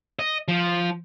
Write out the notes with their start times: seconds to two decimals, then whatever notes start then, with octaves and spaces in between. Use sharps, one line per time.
0.19 D#5
0.48 F3